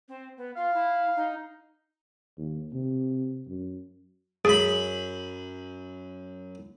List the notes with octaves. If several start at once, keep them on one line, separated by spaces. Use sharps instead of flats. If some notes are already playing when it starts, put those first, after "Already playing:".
C4
B3
F4 F5
E4
D#4
D#2
C3
F#2
F#2 G#4 B5